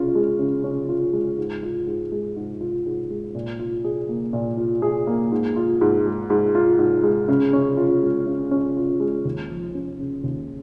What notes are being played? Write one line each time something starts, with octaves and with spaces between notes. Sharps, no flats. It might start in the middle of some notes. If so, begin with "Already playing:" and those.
Already playing: C#3 C#4 F4
G#3
C#3
C#4
F4
G#3
G#2
F4
G#2
G#3
G#2
F4
G#2
G#3
A#2
F4
G#4
A#3
A#2
F4
G#4
A#3
G#2
F4
G#2
G#3
G#2
F4
G#2
G#3
C#3
C#4
F4
G#3
C#3
C#4
F4
G#3
D#2
F3
C#4
C#3
D#2